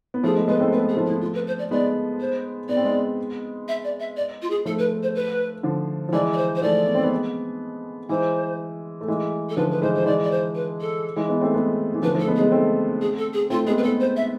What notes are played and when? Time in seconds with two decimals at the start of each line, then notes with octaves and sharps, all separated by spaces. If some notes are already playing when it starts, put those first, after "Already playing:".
0.14 B3
0.23 F3 A3 G#4
0.36 G#3 B3
0.48 G#3 B3 B4
0.60 A3 C4
0.72 G#3 B3 B4
0.89 G#4
0.97 F3 A3
1.06 E4
1.21 F4
1.34 B4
1.47 C5
1.58 D5
1.71 G#3 B3 D5
2.20 C5
2.69 B3 D5
2.77 C4
2.84 G#3 B3
3.68 E5
3.84 D5
4.00 E5
4.16 D5
4.42 F4
4.50 G#4
4.65 F3 A3 A4
4.78 B4
5.03 C5
5.15 B4
5.63 D3 F3
6.09 F3
6.13 E3 G#3 D5
6.33 D5
6.37 C5
6.55 C5
6.62 F3 A3 D5
6.87 B3
6.95 C4
7.03 G#3 B3
8.09 E3 G#3 C5
9.01 A3
9.08 E3 G#3
9.49 A4
9.56 D3 F3 B4
9.70 B4
9.82 E3 G#3 C5
9.94 C5
10.06 E3 G#3 D5
10.23 D5
10.31 C5
10.55 B4
10.80 A4
11.16 E3 G#3
11.29 G#3 B3
11.41 A3 C4
11.54 G#3 B3
11.94 E3
12.02 D3 F3 B4
12.15 F3 A3 A4
12.27 G#3 B3
12.35 G#4
12.39 G#3 B3
12.52 A3 C4
13.01 G#4
13.18 A4
13.33 G#4
13.50 A3 C4 F4
13.66 G#3 B3 G#4
13.78 B4
13.83 G#3 B3 A4
14.00 C5
14.16 E5